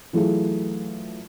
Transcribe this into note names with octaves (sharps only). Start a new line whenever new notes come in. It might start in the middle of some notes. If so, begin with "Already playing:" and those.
E3 F#3 A3 E4 F4 G#4